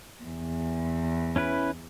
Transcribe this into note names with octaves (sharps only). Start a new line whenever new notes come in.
E2
C#4 E4 B4